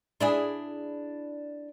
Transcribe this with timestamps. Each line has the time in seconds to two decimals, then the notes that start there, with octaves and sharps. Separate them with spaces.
0.20 D4 E4 G#4